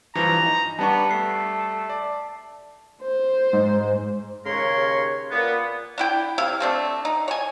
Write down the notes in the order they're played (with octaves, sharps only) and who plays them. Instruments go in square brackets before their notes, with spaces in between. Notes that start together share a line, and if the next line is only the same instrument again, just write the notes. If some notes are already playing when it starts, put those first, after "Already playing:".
[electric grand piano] G2 E3 F3 [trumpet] A#5
[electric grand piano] D#4
[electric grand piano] G3 D4 C#6 [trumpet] B3 [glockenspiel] A5
[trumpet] A3 [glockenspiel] C7
[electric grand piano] D5
[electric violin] C5
[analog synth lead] G#2
[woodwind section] D#2 C#3 A#4 C#5 C6
A#2 A#3 B3
[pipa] D4 E4 G5
C3 E4 F5
A3 C4 D4
D#4
C#5 G#5